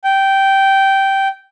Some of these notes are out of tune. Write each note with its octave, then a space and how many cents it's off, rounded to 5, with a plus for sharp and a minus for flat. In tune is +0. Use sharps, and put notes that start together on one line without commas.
G5 -10